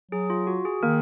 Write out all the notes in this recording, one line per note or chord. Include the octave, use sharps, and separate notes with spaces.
F#3 G#4
F4
F#4
G#4
D#3 A#3 A#4